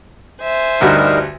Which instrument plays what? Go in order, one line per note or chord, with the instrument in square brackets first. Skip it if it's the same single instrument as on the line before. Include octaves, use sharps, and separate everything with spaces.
[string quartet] C5 E5 G#5
[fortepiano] D2 G2 F#4 [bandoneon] G3 D#4 A#4